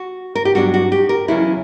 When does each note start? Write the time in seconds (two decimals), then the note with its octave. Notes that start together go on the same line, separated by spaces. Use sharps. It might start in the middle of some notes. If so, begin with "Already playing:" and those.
Already playing: F#4
0.35 A#4
0.45 G4
0.55 G2 F#3 B3 D4 F#4
0.74 F#4
0.92 G4
1.09 A#4
1.28 E2 C#3 F#3 C#4 E4